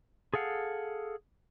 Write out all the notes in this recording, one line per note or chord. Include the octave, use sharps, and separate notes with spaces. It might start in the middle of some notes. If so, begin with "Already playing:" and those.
G#4 A4 F5 F#5